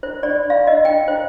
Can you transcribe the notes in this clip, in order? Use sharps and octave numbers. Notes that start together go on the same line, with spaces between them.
C5
D5
F5
D#5
G5
C5